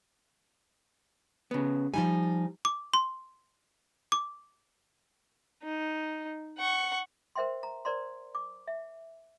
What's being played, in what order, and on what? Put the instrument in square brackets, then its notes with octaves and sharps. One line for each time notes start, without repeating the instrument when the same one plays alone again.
[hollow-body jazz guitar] C#3 B3
[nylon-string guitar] F3 D#4 G#5 [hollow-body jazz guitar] G3
[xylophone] D6
C6
D6
[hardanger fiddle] D#4
F#5 C#6
[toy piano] A#4 C5 E5 G5 C6
A#5
A#4 C5 D5 A#5 C6
D6
E5